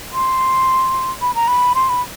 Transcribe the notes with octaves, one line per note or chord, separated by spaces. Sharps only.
C6
B5
A#5
B5
C6
B5